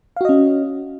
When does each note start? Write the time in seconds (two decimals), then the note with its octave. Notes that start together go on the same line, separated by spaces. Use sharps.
0.16 F5
0.21 F#4
0.25 D#5
0.29 C#4